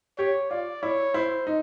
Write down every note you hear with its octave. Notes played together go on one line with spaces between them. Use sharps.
G4 C#5
F4 D5
E4 C#5
E4 C5
D#4